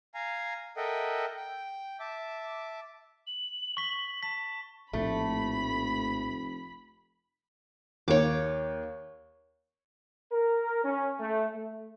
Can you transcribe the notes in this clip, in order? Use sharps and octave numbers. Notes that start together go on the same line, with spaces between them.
F5 G#5 A#5
A4 A#4 D#5 E5 F#5 G5
G5
E5 A5 D6
F#7
C#6 B6 G7
A5 B6
F1 A#1 A2 A3 B5
D#2 C#5 D6
A#4
C#4
A3
A3